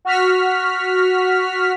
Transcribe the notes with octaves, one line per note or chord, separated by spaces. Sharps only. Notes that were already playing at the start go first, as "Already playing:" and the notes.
F#4 F6 B6